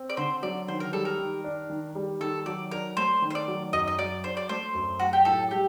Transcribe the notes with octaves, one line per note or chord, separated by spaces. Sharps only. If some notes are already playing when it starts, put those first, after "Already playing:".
Already playing: C4
D5
D3 C5
F#3 D5
D#3 C5
A#4
G3 A4
A#4
D#3
D4
D#3
G3
D#3 A4
F#3 D5
D4 A#4
A3 C5
D#3
C5
D5
F#3
F#2 D#5
D#5
F#3 D5
D4 C5
D5
A3 C5
F#2
F#3 F#4
G4
A2 A4
G3 G4